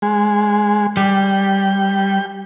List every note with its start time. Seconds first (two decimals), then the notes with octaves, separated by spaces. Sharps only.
0.02 G#3
0.97 G3 G5